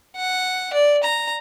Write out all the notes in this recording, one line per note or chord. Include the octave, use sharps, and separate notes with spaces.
F#5
D5
A#5